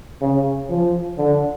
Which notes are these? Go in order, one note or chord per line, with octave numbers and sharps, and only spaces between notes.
C#3
F3
D3